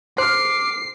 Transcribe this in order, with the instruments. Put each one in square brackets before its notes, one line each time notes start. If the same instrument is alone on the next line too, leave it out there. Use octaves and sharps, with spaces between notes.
[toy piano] C5 [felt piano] C6 F6 [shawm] D6 [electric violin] C7